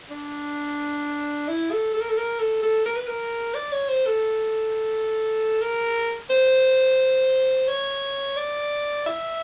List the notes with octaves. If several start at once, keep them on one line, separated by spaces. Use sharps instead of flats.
D4
E4
A4
A4
A#4
A4
A#4
A4
A4
A#4
B4
A#4
D5
C#5
C5
A4
A#4
C5
C#5
D5
E5